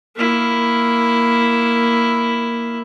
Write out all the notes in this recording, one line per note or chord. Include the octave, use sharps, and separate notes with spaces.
A#3 E4